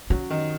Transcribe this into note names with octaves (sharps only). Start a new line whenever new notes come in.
F#3 C#4
D#3